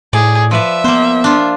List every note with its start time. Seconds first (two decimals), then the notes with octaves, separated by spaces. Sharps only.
0.13 A2 G#4 D5
0.51 F3 B4 D5 E5
0.84 A#3 B3 C5
1.24 D4 F4